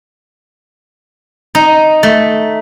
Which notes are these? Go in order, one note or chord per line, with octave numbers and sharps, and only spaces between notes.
D#4
A3